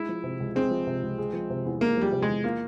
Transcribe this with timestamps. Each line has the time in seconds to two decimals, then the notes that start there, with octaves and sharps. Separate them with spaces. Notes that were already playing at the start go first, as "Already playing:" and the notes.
Already playing: G#3 E4
0.09 F3
0.24 C3
0.40 C#2
0.56 G#3 C4
0.71 F3
0.87 C3
1.03 C#2
1.18 G#3
1.33 F3
1.50 C3
1.65 E2
1.81 G#3 A#3
1.97 F3 G3
2.12 C3
2.22 G#3
2.29 E2
2.44 A#3 F4